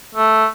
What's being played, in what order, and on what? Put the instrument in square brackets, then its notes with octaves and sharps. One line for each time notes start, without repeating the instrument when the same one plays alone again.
[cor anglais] A3